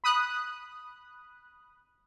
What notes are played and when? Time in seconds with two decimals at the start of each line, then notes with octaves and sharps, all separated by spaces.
0.04 B5 D#6 F#6